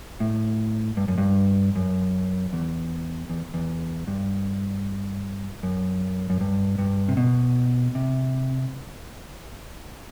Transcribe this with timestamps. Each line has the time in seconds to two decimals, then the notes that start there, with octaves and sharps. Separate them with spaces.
0.20 A2
0.97 G2
1.08 F#2
1.18 G2
1.76 F#2
2.53 E2
3.30 E2
3.54 E2
4.07 G2
5.63 F#2
6.30 F#2
6.41 G2
6.78 G2
7.09 C3
7.17 B2
7.95 C3